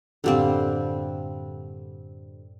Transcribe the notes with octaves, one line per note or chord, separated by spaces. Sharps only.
F#2 A2 D3 G3 C4 F5